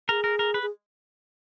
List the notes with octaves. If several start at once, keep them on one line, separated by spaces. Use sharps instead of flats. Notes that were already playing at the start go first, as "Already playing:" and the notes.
G#4 A#4
A#4
A#4
B4
G#4